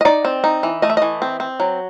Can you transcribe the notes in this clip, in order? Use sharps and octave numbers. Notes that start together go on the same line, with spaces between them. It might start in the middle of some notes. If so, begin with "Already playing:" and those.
D#5
D#4 D5
C4
D#4
E3
A3 D#5
E5
E3 D#5
C4
C4
F#3